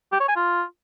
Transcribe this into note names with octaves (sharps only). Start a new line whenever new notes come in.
G4
C#5
G#5
F4